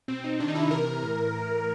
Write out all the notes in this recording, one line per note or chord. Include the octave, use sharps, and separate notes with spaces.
B2 C4
D#4
C3 D#3 D4
D#4
E4
C3 E3 A#4
A2 E3